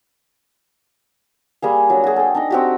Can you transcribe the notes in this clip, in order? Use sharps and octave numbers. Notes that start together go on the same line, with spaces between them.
G3 A#3 G#4
F#3 D4
F#4 G#4
A4 G5
D4 D#4 D#5
C4 F#4 G4